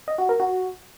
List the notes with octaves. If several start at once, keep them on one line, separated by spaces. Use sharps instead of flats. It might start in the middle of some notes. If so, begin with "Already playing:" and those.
D#5
F#4
A#4
F#4